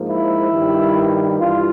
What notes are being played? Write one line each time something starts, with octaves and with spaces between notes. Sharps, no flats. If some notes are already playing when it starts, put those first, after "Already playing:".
Already playing: G#2 F3 A#3
E4
G2 D#3 G3
G2 E3 F4